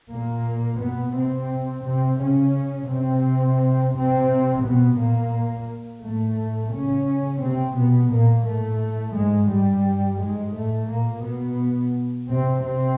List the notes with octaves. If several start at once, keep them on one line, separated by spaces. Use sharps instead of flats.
A#2 A#3
B2 B3
C3 C4
C3 C4
C#3 C#4
C3 C4
C3 C4
B2 B3
A#2 A#3
A2 A3
C#3 C#4
C3 C4
B2 B3
A#2 A#3
A2 A3
G#2 G#3
G2 G3
G#2 G#3
A2 A3
A#2 A#3
B2 B3
C3 C4
C3 C4